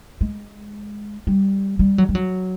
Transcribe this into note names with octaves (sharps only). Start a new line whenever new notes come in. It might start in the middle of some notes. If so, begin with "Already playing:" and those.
G#3
G3
G3
F#3
G3
F#3